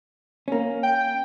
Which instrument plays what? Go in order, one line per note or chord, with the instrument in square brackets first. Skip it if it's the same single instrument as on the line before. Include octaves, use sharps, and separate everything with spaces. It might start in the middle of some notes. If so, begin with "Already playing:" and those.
[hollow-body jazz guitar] A#3 C#4
[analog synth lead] G5